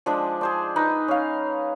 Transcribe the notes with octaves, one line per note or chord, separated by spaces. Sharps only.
F3 G#3 D4
G#4 C5 D5
D#4 B4 D#5
C#4 F5